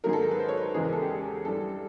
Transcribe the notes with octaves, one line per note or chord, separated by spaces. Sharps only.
G#2 D#3 F#3 G#4 A#4
A4
A#4
B4
C5
C#5
B4
A4
E2 C#3 E3 G#3 G#4
A#4
A4
G4
G#4
G2 E3 G3 A4